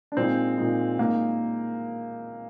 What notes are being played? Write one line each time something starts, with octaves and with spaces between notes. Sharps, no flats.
D4
A#2 G#3 C4 D#4
A#2 G#3 D#4
A#2 G#3 A#3 D#4